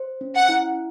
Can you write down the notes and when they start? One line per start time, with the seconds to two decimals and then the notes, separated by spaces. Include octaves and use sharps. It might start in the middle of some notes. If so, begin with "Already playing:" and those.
Already playing: C5
0.21 C#4
0.35 F#5
0.49 E4